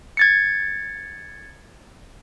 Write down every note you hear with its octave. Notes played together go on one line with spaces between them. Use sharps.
G#6 A6 C#7